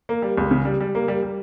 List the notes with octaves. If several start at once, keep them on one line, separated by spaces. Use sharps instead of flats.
A#3
G3
C#2
C#3
G3
G3
A#3
G3
G3